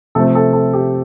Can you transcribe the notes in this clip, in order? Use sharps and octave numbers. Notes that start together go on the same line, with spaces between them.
C3 F3 A3 C4 A4
A4
A4
G4